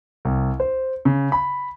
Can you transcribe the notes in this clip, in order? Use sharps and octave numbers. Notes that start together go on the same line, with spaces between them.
C2
C5
C#3
B5